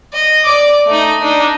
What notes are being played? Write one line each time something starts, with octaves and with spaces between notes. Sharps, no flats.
D#5
D5 D6
A3 D#4
D4 D#4